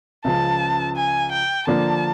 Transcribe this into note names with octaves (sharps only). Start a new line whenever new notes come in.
C#2 C#3 F3 A5
G#5
G5
D3 F3 A#3 D4 A5